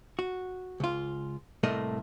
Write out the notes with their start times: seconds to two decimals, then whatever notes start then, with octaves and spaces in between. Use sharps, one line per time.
0.19 F#4
0.80 C#2 F4
1.63 C2 A2 A3 A#3 D#5